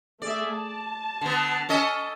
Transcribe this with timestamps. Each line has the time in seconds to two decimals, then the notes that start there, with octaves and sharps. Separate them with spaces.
0.22 A3 G#4 D5 E5
0.54 A5
1.21 D3 B3
1.69 C#4 A4 D#5